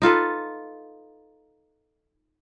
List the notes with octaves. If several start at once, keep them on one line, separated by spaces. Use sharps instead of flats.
D#4 F4 A4 B4